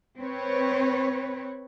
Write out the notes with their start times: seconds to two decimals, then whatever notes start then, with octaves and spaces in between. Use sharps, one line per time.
0.18 C4 B4 C#5